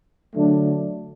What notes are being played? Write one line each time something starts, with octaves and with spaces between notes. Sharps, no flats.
D3 F#3 A3 D4